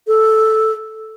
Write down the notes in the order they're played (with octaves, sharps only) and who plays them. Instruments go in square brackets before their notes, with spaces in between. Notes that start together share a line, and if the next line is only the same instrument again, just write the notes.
[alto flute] A4